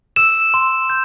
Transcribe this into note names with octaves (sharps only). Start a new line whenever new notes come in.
E6 E7
C6
G6